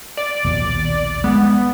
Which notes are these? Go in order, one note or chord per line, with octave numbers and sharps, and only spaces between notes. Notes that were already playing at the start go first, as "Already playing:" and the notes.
D5
A#1 D#2 B2
G#3 B3